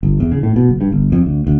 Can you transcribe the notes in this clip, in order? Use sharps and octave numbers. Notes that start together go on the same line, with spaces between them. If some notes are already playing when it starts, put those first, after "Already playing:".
G1
E2
C#3
A2
B2
F#1
G2
G1
F2
D2
D2